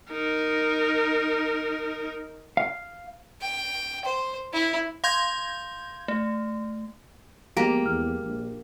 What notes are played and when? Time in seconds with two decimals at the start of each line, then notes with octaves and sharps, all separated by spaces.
0.11 D#4 A#4
2.57 F5
3.41 G5
4.05 C5
4.53 E4
5.04 F5 C6 G6 G#6
6.08 A3
7.57 F3 G#3 A#3 B3 G4 A#5 A#6 D7
7.86 E2 F6
8.23 A#1